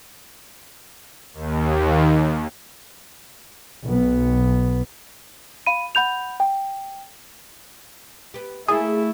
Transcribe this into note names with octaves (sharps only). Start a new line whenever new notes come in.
D#2
B1 B3
F5 B5 D#7
F#5 B5 G6 F7
G5
B3 G4
A3 A#3 E4 F4 G#4